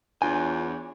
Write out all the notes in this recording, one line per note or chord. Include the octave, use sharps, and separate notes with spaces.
E2 D4 F4 C#5 G#5